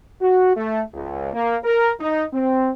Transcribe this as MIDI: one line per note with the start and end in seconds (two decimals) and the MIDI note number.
0.21 0.53 66
0.57 0.82 57
0.94 1.33 37
1.33 1.57 58
1.64 1.91 70
2.00 2.25 63
2.33 2.71 60